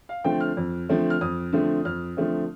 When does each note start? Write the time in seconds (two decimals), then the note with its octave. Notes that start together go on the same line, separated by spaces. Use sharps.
0.09 F5
0.24 D3 F3 A3 C4 G5
0.40 F6
0.57 F2
0.89 D3 F3 A3 C4
1.10 F6
1.21 F2 D#6
1.52 D3 F3 A3 C4
1.85 F2 F6
2.17 D3 F3 A3 C4